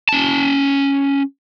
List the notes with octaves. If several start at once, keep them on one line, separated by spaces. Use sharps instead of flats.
C#4 A5